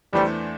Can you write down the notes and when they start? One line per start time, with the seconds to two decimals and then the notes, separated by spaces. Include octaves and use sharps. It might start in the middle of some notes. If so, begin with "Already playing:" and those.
0.13 E2 E3 G3 A3 D4 C5